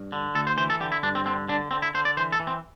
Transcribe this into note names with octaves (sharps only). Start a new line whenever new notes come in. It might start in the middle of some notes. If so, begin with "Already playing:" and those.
Already playing: G2
D3
D2 A4
C5
E3 C5
A4
D3 G4
E4
G2 D4
C4
D3 C4
D3 D4
D3 C4
E4
D3 C5
D5
E3 C5
A4
E3
C4